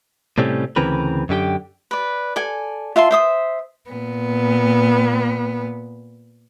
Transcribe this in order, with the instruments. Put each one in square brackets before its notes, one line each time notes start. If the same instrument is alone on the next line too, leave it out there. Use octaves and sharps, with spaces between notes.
[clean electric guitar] A2 C3 G3 A3 C4 C#4
D2 C#3 E3 C4 A#4 B4
F#2 D3 G4 G5
[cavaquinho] B4 D5
A4 D5 G#5
F4 E5 A5 C6
C5 E5 D#6
[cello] A#2 B3